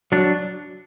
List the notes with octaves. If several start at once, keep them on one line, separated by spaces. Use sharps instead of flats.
F#3 D4